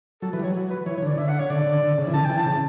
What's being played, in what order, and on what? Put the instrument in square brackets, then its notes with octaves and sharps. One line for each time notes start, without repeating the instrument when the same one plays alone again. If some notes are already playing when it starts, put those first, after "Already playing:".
[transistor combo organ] F#3 [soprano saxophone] A4
[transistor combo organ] E3 [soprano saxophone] B4
[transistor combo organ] G3
[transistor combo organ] F#3 [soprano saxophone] C#5
[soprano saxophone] B4
[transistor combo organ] E3 [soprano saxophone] C#5
[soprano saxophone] C#5
[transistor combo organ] D3 [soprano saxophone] D5
[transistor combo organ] D3 [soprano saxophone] E5
[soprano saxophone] F#5
C#5
[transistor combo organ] D3 [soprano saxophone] D5
[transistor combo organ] D3
D3
C#3
E3
[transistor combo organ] D3 [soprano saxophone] A5
[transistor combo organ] E3 [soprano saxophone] G5
[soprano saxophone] A5
[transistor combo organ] C#3